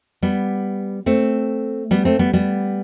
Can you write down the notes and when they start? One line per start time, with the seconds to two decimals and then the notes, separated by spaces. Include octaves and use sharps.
0.22 G3 B3
1.06 A3 C4
1.91 G3 B3
2.05 A3 C4
2.19 G3 B3
2.33 G3 B3